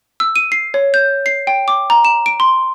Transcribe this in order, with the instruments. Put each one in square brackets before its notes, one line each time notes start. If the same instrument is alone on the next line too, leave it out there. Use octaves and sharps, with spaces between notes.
[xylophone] E6
D#7
C7
C#5
G6
C7
G5
D6
A#5
E7
D7
C6